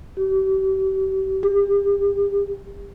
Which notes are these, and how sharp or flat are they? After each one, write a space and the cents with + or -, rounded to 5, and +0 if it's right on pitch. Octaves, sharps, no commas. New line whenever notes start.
G4 -35
G4 +35